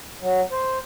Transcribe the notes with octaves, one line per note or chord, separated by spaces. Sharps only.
F#3
C5